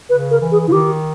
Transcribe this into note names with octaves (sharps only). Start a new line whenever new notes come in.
C#3 B4
A#4
E3
G#4
C#3 E4
D#3 G4